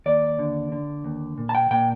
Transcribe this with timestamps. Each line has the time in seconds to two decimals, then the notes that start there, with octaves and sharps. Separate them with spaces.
0.06 D#2 D5
0.39 D3
0.72 D3
1.04 D#2
1.38 A#2
1.49 A5
1.55 G5
1.71 A#2 G5